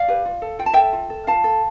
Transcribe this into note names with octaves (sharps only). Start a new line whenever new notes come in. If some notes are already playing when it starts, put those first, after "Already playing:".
Already playing: D5 F5
G4 B4
F4
A4
F4 G5
A5
A4 E5 G5
F4
A4
F4 F5 A5
A4